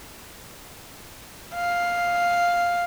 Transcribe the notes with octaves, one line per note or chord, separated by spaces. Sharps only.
F5